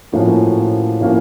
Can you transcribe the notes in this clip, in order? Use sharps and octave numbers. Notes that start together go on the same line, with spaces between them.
A2 F3 A#3 C#4 F#4
A2 F3 A#3 C#4 F#4